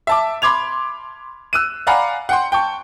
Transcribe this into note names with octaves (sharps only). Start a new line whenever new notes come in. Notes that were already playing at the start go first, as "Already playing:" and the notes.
E5 A5 D6
B5 C6 D6 G#6 F7
E6 F#6 D#7
D5 F5 F#5 G#5 A#5 B5
F#5 G5 C6
G5 A5 C#6